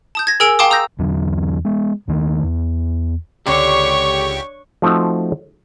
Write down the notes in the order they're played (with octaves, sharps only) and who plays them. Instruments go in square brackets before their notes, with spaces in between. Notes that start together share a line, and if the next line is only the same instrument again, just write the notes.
[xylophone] A5 D#6 G6
G#6 A#6
G#4 A#4 G#5 E6 D7 F7
F5 G5 A5 C6 D6 D#6
A#5 D#6 E6 G6 A#6
[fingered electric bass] E2 D3 E3 F#3
G#3 B3
D#2 D#3 A3
E2
[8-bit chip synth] C#2 G4 [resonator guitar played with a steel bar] D3 [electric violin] C#5 [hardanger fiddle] C#6
[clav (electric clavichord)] F3 A3 C4 D#4 F#4